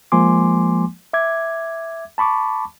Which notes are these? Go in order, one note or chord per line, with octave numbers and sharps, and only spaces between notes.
F3 G#3 A#3 G#5 C6 D6
E5 D6 G#6
A5 B5 C#6 D6